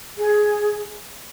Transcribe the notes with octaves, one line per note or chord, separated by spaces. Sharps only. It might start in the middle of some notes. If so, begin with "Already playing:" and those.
G#4